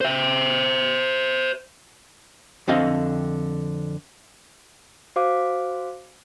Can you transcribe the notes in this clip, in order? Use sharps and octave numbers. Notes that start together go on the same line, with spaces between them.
C5 E5
F2 D3 C4 D#5 F5
F#4 C5 F5 D6